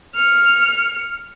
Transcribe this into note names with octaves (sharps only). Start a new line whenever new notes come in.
F6 C#7